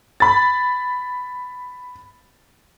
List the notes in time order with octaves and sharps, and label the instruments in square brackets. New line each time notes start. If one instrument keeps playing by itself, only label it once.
[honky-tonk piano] B5 A6